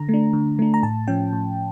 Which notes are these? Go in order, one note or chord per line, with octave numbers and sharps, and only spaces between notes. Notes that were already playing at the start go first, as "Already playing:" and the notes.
Already playing: D3 A#5
A3 D4
D3
A3 D4
A#5
A2 A5
F3 C#4 G5
A2